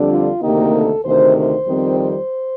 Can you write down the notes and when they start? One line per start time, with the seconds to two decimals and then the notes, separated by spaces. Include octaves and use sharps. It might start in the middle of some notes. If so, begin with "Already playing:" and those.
Already playing: F2 D3 G3 D4
0.10 F4
0.42 D2 C3 D#3 A#3 D#4 G4
0.74 A4
1.04 D2 C3 D#3 C5
1.36 C5
1.67 F2 D#3 G3 C4
1.99 C5